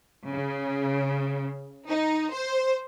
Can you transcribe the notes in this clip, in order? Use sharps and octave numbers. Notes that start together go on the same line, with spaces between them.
C#3
D#4
C5